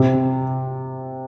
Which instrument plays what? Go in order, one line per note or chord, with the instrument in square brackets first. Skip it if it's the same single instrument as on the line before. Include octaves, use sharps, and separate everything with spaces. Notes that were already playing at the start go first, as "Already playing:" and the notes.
Already playing: [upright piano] C3